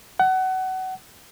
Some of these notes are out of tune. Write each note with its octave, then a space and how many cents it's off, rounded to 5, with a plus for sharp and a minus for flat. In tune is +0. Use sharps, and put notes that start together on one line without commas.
F#5 +25